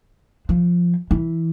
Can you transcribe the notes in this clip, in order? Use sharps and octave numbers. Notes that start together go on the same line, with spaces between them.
F3
E3